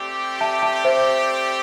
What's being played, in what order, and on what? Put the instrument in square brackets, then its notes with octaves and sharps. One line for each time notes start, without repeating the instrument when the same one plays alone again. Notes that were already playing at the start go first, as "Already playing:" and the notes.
Already playing: [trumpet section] A3 C4 G4 D5
[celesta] E5 A5
E5 A5
C5 E5